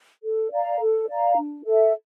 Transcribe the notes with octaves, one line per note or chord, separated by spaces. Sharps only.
A4
D5 F5 A#5
A4
D5 F5 A#5
D4
A4 E5